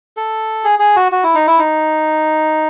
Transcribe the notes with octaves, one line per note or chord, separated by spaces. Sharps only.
A4
G#4
G#4
F#4
F#4
E4
D#4
E4
D#4